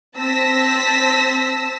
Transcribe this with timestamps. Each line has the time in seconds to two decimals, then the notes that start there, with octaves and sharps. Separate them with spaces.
0.17 C4 A5 E6 A#6 B6